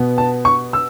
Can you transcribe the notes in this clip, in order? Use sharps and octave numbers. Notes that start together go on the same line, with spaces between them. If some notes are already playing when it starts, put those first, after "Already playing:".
Already playing: B2 B3
A5
C#6
E6